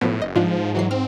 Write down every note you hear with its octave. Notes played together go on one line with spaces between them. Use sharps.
B1 A2 F3 B3
F#1 D#5
G1 G#2 F3 D4 F4
C#2 E3 F#3 C7
C4 F6